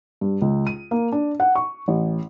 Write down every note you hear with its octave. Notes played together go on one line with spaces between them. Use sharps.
G2
C#2
D#7
A#3
D4
F#5
C#6
A1